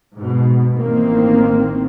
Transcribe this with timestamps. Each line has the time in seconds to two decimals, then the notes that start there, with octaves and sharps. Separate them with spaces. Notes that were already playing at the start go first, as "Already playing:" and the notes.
0.15 G#2 B2
0.76 A1 D#3 A#3 C4